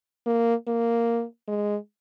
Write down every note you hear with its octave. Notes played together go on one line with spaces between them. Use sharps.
A#3
A#3
G#3